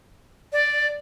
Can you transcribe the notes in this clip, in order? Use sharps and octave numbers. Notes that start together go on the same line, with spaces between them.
D5